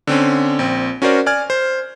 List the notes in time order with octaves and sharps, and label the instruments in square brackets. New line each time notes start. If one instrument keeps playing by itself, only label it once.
[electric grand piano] D3 C4 C#4
A#1 C4
C#4 F#4 A#4 C5 D5
D5 G#5 F6 G#6
C5